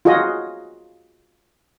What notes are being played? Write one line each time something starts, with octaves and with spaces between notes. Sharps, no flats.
F4 F#4 G#4 D#5